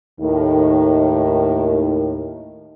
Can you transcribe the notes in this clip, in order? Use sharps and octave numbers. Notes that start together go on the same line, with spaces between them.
D#2 A2 D#3